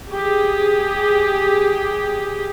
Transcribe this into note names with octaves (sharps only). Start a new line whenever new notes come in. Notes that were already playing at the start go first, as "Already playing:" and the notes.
G4 G#4